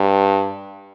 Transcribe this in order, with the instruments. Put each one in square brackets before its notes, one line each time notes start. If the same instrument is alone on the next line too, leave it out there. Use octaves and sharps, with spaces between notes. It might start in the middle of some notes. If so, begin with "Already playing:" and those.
Already playing: [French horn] G2